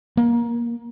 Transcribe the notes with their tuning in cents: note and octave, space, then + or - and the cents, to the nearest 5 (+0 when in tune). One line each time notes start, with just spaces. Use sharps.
A#3 +20